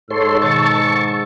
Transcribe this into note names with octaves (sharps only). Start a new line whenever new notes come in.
G#2 A4 C#5 C6 E6
B2 D#3 A5 C#6